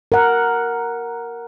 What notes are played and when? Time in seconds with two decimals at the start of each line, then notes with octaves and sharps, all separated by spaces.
0.12 A#4 F#5